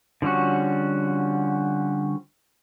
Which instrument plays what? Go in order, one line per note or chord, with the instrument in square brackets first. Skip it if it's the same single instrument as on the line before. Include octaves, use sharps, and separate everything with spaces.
[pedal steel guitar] D3 F3 G3 C#4 F#4